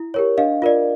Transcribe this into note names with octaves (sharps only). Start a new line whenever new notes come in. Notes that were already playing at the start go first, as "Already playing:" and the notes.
Already playing: E4
G4 A#4 C#5
D4 D#5 F5
F4 A#4 D5